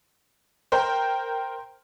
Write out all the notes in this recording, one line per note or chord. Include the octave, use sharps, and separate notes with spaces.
A#4 C5 G5